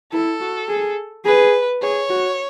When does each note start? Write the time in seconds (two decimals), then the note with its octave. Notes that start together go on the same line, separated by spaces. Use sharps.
0.13 E4 A4
0.40 F#4
0.69 G#4
1.25 G#4 B4
1.82 G#4 C#5
2.10 F#4